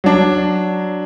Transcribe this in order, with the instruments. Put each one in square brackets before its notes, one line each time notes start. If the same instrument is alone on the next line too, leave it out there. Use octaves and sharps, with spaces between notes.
[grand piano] F#3 D4